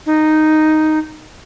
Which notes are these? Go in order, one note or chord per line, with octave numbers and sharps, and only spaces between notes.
D#4